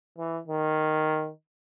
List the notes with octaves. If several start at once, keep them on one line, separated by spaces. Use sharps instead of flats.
E3
D#3